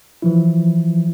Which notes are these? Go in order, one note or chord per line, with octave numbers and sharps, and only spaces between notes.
E3 F3 E4